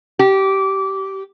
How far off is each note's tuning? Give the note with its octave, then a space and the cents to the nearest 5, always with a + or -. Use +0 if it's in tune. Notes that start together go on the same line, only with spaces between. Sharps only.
G4 -20